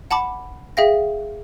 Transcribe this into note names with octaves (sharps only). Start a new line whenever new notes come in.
F#5 A5 B5 D6
G#4 E5 F5 G5 A#6